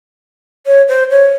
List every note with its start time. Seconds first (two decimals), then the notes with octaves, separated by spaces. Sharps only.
0.66 C#5
0.88 C5
1.11 C#5